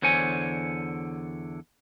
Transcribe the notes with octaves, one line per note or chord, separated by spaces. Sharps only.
E2 D3 C5 C#5 G#5